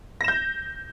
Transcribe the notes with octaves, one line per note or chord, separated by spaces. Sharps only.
G6 A#6 E7